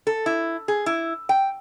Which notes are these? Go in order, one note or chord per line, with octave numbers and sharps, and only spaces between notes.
A4
E4
G#4
E4
G5